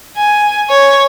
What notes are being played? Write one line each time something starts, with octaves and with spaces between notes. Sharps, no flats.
G#5
C#5